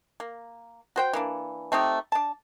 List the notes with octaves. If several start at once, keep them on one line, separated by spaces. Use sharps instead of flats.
A#3
F#4 C5 G5
E3 A#3 D4
A3 C4 D#4 G4
D4 A5